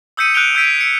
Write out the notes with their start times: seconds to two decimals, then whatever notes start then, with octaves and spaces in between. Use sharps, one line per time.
0.17 D#6 E6 G6 B6 C#7 D#7
0.34 F#6 G6 C#7 D7 F7 G7
0.55 E6 G6 G#6 B6 D7 D#7
0.81 C#7